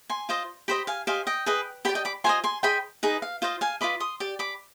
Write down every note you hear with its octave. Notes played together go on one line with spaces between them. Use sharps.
G#5 C6
F4 C5 D#5
G4 C5 D#5 G5 B5
F5 G#5
G4 C5 D#5 F5 G#5
D#5 G5
G#4 B4 D#5
G4 D5 G5 B5
D#5 G5
B5 D6
F4 C5 D#5 G#5 C6
G#5 C6
G#4 C5 D#5 G5 B5
D#4 G#4 B4 D#5
F5
F4 C5 D#5 F5
F5 G#5
F4 B4 D#5 B5 D6
C6 D#6
G4 D5
B5 D6